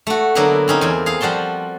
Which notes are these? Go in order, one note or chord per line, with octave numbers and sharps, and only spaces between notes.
A3 F#4
D3 F#3 A#3 B3 E4 B4
C4 C#4 D#4
E2 C5 G#5
G#4 F5
F3 G3 F#4 A5 C6